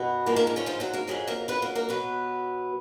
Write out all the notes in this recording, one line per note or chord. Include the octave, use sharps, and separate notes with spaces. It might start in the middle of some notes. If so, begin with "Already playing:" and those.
Already playing: F#2 B2 B3
G#2 F3 G#3 A#3
A#3
A#3
C#3 C#4
F3 F4
F#3 F#4
A#3 A#4
F2 C#3 F#3 G#3 G#4
A#3 A#4
B3 B4
A#3 A#4
A#3 A#4
B2 F#3 B3 B4